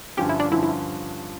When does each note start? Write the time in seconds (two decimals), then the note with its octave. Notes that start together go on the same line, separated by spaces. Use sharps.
0.17 G2 D3 F3 C#4 G4
0.29 E4
0.40 D4
0.51 G2 D3 F3 C#4 E4
0.63 E4